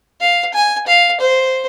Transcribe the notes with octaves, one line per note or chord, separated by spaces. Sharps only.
F5
G#5
F5
C5